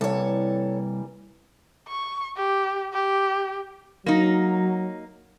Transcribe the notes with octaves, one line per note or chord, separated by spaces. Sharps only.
C2 E3 G3 A#3 A4 C#5
C#6
G4
G4
F#3 A#3 D#4